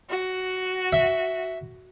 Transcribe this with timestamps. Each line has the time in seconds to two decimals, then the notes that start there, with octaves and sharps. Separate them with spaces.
0.10 F#4
0.93 E5